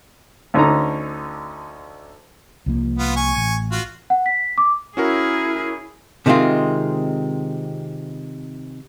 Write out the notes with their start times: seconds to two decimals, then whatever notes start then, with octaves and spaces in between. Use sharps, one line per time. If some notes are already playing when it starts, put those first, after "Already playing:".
0.54 D2 D3 C#4 D#4 A#5
2.66 C2 F3 A#3
2.99 B3 F4
3.16 G#5 C#6
3.36 A1
3.71 F4 F#4
4.10 F#5
4.26 B6
4.58 D6
4.97 C#4 E4 F#4 G#4 A#4
6.26 C3 D#3 G#3 C4 F4